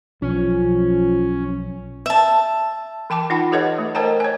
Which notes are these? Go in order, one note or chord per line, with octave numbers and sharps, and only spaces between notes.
B1 F3 C#4
E5 A5
E3 G5 A5 D6
D#4 F4 F#5 B5
G4 A4 B4 C#5 D#5 F#5
A3
A#4 C5 D#5 G5 A5 A#5
C#5 G#5